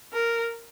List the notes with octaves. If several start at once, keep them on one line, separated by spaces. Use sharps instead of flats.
A#4